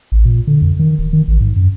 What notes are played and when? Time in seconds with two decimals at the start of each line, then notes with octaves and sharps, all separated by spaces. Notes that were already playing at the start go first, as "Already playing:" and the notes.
0.12 A1
0.25 A#2
0.47 D3
0.62 F2
0.79 D#3
0.98 D1
1.13 D#3
1.28 A1
1.41 G#2
1.56 F#2